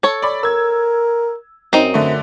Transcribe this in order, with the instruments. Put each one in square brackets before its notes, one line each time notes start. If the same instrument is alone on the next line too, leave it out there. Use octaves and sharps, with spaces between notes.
[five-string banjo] A4 C#5
[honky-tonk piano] D5 B5
[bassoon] A#4 [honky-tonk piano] E6 G#6
[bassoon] F#2 [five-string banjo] C4 D#4
[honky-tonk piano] D3 A3